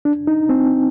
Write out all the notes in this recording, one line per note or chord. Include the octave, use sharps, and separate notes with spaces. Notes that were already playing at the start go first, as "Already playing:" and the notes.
D4
D#4
C4